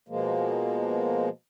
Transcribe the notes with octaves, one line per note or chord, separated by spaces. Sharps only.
B2 F3 G#3 A#3